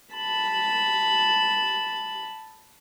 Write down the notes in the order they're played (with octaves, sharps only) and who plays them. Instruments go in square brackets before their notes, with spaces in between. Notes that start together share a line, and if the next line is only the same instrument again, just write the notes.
[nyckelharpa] A5 B5